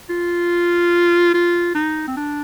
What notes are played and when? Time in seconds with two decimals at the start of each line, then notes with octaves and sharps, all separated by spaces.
0.10 F4
1.34 F4
1.75 D#4
2.08 C4
2.17 D4